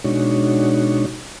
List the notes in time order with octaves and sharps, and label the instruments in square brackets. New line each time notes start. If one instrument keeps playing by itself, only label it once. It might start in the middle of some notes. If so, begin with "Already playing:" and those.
[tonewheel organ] B2 G#3 D4 D#4 F#4 C#5